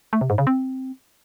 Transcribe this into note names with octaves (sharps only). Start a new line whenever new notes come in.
A3
C3
G#2
C#3
C4